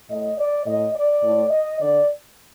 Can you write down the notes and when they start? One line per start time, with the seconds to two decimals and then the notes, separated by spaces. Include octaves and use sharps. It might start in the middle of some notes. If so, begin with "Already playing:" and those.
0.10 A2 D#5
0.38 D5
0.67 A2 D#5
0.95 D5
1.23 A2
1.51 D#5
1.80 D3 D5